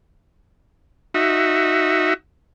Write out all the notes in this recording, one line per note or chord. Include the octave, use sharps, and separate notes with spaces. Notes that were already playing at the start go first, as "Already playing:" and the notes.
D#4 F#4 E5